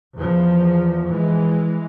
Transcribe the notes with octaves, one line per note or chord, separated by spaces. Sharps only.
E2 F3
E3 G#3